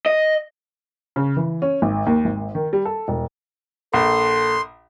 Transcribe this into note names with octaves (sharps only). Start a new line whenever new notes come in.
D#5
C#3
E3
C#4
G#1
D#2
G#1
D#3
G3
A4
E1
A#1 A4 C6